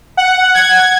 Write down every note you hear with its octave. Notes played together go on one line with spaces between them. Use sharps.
F#5
G#6